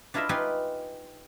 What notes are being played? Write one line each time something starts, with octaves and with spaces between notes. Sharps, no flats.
D4 E4 F4 A#4 D#5 E5
D#4 F4 G4 B4 G#5